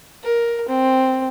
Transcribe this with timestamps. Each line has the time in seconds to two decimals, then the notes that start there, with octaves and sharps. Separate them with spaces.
0.23 A#4
0.69 C4